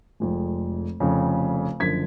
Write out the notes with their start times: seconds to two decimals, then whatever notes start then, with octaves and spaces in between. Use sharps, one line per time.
0.20 F1 F2 F3 G#3
1.00 F1 F2 C#3
1.80 F#1 F#2 D3 F3 G#6 B6